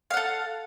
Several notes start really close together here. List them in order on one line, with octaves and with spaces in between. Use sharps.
F5 F#5 A4